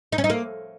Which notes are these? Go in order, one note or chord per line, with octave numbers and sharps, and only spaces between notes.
D#4
C#4
D#4
A#3